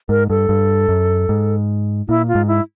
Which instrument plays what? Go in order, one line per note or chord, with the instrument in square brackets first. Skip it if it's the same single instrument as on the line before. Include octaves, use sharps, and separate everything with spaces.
[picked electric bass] G#2 [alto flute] A#4
[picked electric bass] G2 [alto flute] A4
[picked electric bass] G2
F#2
G#2
[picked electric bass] A#2 [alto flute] E4
[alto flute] F4
[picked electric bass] G#2
[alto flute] E4